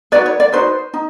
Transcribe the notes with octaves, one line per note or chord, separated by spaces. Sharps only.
D#4 F#4 B4 D5
C#5
D5
D#4 F#4 B4 C5
D#4